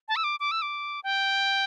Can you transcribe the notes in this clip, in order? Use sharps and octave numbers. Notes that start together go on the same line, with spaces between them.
A5
E6
D6
D6
E6
D6
G5